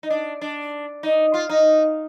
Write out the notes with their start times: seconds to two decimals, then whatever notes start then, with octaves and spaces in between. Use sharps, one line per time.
0.03 D#4
0.10 D4
0.41 D4
1.03 D#4
1.34 F4
1.49 D#4